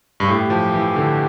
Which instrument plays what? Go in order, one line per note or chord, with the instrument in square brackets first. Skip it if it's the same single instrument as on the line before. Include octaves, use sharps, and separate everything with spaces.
[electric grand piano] G2
[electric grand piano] A2 [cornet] G4
[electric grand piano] F3
E3
D3